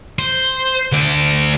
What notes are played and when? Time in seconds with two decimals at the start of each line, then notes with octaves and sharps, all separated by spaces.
0.19 C5
0.92 D2 D5